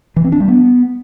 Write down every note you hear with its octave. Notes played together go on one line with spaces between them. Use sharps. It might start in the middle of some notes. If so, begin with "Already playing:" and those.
E3
C4
D4
G3
B3